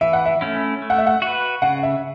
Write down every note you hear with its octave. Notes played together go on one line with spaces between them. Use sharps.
E3 E5
F#5
E5
A3 C#4 E4
A3
F#5
E5
F#5
F#4 B4
C#3 F#5
E5